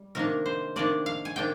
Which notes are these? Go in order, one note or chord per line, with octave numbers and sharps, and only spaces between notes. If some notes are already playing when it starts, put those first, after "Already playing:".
Already playing: G3
C3 D#3 A#3 D4 A#4
C5
C3 D#3 A#3 D4 D5
F5
G#5
C3 D#3 A#3 D4 G5